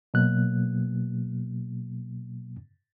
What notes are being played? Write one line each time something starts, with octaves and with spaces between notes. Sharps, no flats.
B2 F#3 A#3 F#6